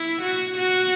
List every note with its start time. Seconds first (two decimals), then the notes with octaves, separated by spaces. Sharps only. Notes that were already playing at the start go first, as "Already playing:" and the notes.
Already playing: E4
0.22 F#4
0.58 F#4